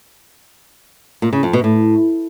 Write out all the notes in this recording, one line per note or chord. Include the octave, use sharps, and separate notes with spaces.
A#2
C#3
F2
B2
A2